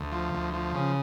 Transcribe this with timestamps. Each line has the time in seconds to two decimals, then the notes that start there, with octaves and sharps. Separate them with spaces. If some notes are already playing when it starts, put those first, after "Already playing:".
Already playing: D2
0.12 F3
0.33 D2
0.54 F3
0.75 C#3